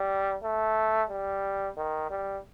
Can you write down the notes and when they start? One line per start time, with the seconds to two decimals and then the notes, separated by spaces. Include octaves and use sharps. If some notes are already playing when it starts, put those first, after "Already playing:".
Already playing: G3
0.44 A3
1.09 G3
1.77 D#3
2.10 G3